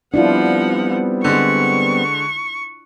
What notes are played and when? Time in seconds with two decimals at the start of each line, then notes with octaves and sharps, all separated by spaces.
0.14 F3 G3 B3 C4 D4 E4 F4 F#5
1.24 D3 G#3 C#6